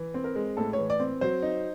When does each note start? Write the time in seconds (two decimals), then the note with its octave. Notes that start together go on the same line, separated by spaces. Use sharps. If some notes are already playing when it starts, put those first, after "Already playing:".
Already playing: E3
0.14 C4
0.24 A#4
0.35 G#3
0.57 A2 A4
0.73 E3 C#5
0.90 D5
1.00 C4
1.21 F#3 C5
1.42 D#4